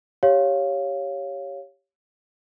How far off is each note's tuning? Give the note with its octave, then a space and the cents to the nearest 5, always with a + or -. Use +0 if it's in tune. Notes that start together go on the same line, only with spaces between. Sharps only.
G4 +0 C#5 +0 F5 +0